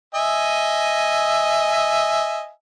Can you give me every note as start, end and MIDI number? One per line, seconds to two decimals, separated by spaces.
0.15 2.49 75
0.15 2.49 76
0.15 2.49 80